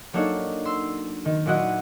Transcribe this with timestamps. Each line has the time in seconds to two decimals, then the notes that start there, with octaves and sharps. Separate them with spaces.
0.13 F#3 A#3 D4 D#4 A4 C#5
0.65 C6 E6
1.25 D#3
1.46 A#2 F#3 E4 F#4 D#5 F#5